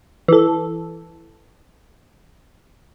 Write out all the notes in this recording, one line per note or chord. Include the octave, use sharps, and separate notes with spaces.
E3 A4